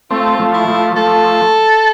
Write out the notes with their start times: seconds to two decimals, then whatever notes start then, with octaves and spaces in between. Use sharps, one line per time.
0.10 A3 C4 F4
0.39 F3 A3
0.54 E4
0.68 F3 A3
0.96 F3 A3 A4